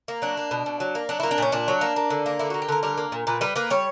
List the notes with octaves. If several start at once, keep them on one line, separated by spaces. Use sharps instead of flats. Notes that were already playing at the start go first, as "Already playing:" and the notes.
A#3
F#3 D4
A#3
B2
B2
F#3
A#3
F#3 D4
A#3 E4
D4
A#2 C#4
A#2 D4
F#3
A#3
A#3
D3
A#3
D3 E4
A#3 F#4
G4
D3 A#4
G3 A#4
A#3
A#2
A#2 B4
G3 B4
A#3 B4
G3 C#5